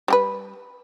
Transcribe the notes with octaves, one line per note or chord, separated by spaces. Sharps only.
G3 G4 B4